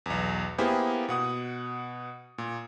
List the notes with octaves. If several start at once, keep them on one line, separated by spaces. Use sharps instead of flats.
B1 E2
A#3 B3 E4 G4 G#4 C5
B2 F#5 D#6
A#2